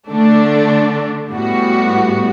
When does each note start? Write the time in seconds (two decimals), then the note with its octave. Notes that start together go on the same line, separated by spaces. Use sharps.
0.09 D3 A3 D4
1.31 A2 G3 B3 F#4